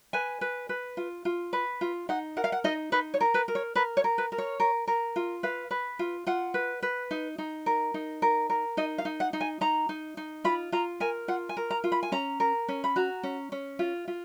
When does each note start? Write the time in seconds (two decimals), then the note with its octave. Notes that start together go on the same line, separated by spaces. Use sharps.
0.13 B4 G#5
0.41 B4
0.69 B4
0.97 F4
1.25 F4
1.53 B4
1.81 F4
2.09 D#4 F#5
2.37 A#4 F#5
2.44 F5
2.52 F#5
2.64 D#4 D#5
2.92 D#4 B4
3.14 C#5
3.21 A#4
3.34 B4
3.48 A#4
3.55 C#5
3.76 A#4 B4
3.97 C#5
4.04 A#4
4.18 B4
4.32 A#4
4.38 C#5
4.60 A#4
4.88 A#4
5.16 F4
5.43 B4 F5
5.71 B4
5.99 F4
6.27 F4 F#5
6.54 B4
6.83 B4
7.11 D#4
7.38 D#4
7.66 A#4
7.94 D#4
8.22 A#4
8.50 A#4
8.77 D#4 D#5
8.98 F5
9.05 D#4
9.20 F#5
9.33 D#4
9.41 G#5
9.61 D#4 A#5
9.89 D#4
10.17 D#4
10.44 F4 B5
10.72 F4 A#5
11.00 A#4 G#5
11.28 F4 F#5
11.49 G#5
11.57 A#4
11.70 A#5
11.84 F4
11.92 B5
12.03 G#5
12.12 C#4 A#5
12.40 A#4
12.68 C#4
12.84 B5
12.96 F#4 A#5
13.23 C#4
13.52 C#4
13.79 F4
14.08 F4